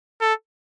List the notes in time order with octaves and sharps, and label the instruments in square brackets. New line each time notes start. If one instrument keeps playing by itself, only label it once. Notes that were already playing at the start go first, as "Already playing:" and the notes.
[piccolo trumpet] A4